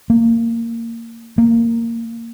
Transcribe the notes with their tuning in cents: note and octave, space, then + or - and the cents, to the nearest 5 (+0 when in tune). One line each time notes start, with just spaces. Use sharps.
A#3 -20
A#3 -10